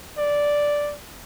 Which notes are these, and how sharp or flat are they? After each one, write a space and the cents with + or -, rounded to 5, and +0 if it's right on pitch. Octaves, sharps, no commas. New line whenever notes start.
D5 -5